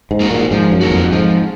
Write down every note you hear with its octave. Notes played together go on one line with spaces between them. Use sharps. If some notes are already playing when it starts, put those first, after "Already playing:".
G#2
A#3 D#4 F#4
A#2
G#2 F3
F#2
A#3 D#4 F#4
F2
G#2 F3